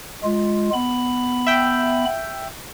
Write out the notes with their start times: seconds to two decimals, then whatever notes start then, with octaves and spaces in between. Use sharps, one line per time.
0.24 G#3 F4
0.73 B3 B5
1.47 E5 G5